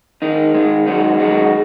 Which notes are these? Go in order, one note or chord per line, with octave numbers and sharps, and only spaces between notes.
G#2 D#3 G#3 D#4
G#2 D#3 G#3 D#4
F#2 D#3 G#3 D#4 F#4
F#2 D#3 G#3 D#4 F#4